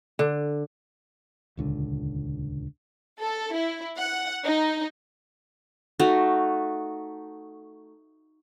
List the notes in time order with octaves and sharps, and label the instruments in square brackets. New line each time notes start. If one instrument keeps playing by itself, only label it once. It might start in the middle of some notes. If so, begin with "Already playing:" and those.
[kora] D3
[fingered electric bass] D#1 C#2 D3
[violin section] A4
E4
F#5
D#4
[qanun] A3 D#4 F#4